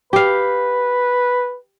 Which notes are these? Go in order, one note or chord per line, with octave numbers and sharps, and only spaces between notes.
G4 B4 F5